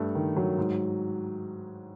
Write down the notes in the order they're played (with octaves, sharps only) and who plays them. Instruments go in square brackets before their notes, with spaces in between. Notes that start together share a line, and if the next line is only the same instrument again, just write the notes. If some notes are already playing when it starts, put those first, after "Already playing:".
Already playing: [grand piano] G2 A3
D#3
F#3
G#2